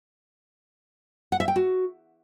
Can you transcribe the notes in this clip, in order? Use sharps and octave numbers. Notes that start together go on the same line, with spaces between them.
F#5
E5
G5
F#4